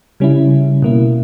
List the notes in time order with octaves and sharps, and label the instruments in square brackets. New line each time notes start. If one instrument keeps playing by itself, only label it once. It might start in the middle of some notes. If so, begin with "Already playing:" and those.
[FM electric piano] C#3 G3 C#4 E4
B2 A#3 E4